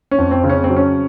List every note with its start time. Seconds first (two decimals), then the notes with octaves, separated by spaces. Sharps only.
0.11 C#4
0.18 F2
0.31 C4
0.44 C#3
0.49 C#4
0.64 C4
0.69 F#3
0.76 C#4